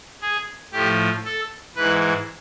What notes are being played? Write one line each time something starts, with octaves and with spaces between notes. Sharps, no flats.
G#4
A2 F3 G4
A4
G#2 E3 B4